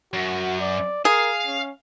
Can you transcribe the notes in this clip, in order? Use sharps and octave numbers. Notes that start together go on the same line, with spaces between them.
F#2 F#4
D5
G#4 A#4 F5
C#4